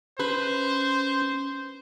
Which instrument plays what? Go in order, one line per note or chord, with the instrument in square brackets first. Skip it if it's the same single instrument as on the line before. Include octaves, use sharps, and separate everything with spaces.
[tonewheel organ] C#4 [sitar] B4 [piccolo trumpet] C5